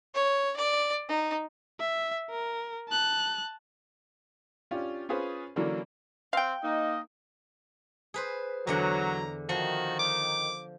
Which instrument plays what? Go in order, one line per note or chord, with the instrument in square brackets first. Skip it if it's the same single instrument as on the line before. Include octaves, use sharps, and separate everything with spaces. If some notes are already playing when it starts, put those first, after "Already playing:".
[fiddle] C#5
D5
D#4
[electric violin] E5
A#4
A5 F#6
[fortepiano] C#4 D4 F4 G4
C#4 F4 G#4 B4 C5
D3 E3 F#3 A#3 C#4 D4
[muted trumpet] C4 [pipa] F5 G5
[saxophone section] A#3 D#4 [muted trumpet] D#5
[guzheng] G#4 B4 C5
[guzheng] E2 D3 F#5 [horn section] F#3 [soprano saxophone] A#5
[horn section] D#3 [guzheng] F3 A#5 [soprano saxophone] F#4
[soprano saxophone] D6